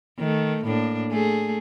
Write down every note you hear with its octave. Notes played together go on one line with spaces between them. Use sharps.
D#3 A3
A2 A#3 D4
A3 G#4